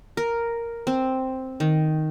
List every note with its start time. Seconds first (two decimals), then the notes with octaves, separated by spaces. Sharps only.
0.17 A#4
0.87 C4
1.60 D#3